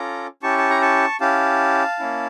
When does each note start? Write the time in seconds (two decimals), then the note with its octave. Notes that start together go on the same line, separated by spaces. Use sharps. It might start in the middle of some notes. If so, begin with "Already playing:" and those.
Already playing: C#4 F4 A4 A#5 D6
0.43 C#4 E4 G4 A5 C#6
0.58 A5
0.70 A#5
0.82 A5 C#6
1.20 C#4 E4 G4 F5 A5
2.00 A#3 C#4 E4